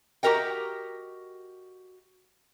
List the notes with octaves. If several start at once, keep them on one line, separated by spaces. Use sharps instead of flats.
F#4 G4 A#4 D#5 G5